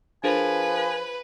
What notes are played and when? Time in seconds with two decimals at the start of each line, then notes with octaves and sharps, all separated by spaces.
0.24 F3 D4 G#4 A#4 B4 G#5